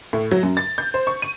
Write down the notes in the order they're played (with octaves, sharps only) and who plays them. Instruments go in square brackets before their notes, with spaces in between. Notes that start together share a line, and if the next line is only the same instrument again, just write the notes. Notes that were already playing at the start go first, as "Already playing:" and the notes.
[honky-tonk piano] A2
F#3
F#2
A6
G6
C5
C#6
D#7